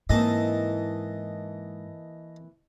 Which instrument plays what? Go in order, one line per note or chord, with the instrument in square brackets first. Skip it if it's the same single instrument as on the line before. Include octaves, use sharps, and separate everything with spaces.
[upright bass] G#2 [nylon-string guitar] E3 A#3 C4 [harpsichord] D#5 A5